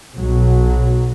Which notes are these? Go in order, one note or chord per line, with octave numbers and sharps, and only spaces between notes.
B1 B2 F#3